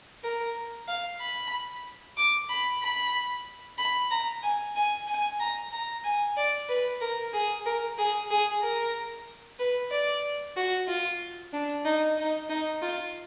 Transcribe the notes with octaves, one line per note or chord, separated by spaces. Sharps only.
A#4
F5
B5
D6
B5
B5
B5
A#5
G#5
G#5
G#5
A#5
A#5
G#5
D5
B4
A#4
G#4
A#4
G#4
G#4
A#4
B4
D5
F#4
F4
D4
D#4
D#4
D#4
F4